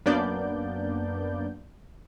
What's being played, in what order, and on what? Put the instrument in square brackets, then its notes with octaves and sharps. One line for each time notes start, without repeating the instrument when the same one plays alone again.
[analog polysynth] F#2 A#3 B3 D4 D5 G6